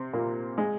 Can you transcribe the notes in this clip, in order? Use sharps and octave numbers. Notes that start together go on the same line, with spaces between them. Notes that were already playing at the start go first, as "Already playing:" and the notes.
Already playing: C3 C4
A#2 A#3
G#3